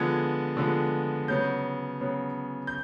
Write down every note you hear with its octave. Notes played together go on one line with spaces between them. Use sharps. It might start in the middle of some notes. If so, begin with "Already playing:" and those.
Already playing: D3 F3 G#3 B3 G#6
D3 F3 G#3 B3
C#3 F#3 B3 G6
C#3 F#3 B3
G6